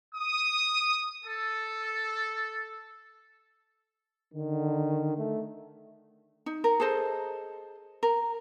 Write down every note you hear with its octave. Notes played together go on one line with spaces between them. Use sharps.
D#6
A4
D3 D#3
A3
D#4
A#4
G#4 A4 C5 D#5
A#4